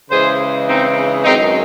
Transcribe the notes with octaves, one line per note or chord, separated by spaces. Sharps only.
C#3 E3 G#3 G#4 C5
C4 D#4
F#2 D#3 G#3 C4 D#4